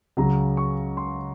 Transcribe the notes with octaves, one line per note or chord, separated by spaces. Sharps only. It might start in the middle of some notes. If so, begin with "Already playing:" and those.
C#2 C#3 F#3 A#5
C#6
C6